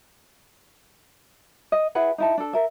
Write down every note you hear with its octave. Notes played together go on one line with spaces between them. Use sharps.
D#5
E4 G#4 B4 F#5
D#4 E4 A5
D4 A4
A#4 E5